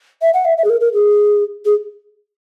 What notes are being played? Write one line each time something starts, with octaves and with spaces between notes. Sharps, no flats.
E5
F#5
E5
E5
G#4
A#4
A#4
G#4
G#4